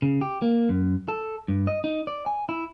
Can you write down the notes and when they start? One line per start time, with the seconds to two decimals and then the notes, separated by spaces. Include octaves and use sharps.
0.02 C#3
0.21 G4
0.42 A#3
0.69 F#2
1.08 A4
1.48 G2
1.67 D#5
1.84 D#4
2.07 D5
2.26 G#5
2.49 E4